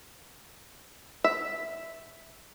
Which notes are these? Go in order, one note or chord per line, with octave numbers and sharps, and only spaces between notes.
E5